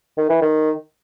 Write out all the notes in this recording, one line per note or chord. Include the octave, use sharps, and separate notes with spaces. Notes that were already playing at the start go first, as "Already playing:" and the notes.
D#3
E3
D#3